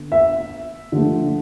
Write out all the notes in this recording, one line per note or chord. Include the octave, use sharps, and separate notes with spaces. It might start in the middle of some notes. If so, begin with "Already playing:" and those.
Already playing: D3 B3
E5
D3 F3 A3